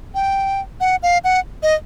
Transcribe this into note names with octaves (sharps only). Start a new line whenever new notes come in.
G5
F#5
F5
F#5
D#5